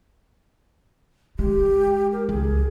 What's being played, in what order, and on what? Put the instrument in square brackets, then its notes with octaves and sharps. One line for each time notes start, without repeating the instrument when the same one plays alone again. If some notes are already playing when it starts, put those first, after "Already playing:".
[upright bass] G#3 [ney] G4
[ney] A#4
[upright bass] C#2 [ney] G#4